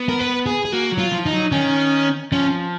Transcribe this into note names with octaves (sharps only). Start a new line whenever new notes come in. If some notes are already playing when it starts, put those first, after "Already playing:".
Already playing: B3
A#4
B4
G#4
G#4
A#3 F#4
F#3
F4
F3
D#4
F#3
D#3 C#4
F3 C#4